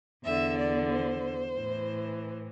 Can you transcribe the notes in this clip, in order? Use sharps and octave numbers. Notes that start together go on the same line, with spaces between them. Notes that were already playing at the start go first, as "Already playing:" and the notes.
E2 D3 E5
D5
C5
A2 E3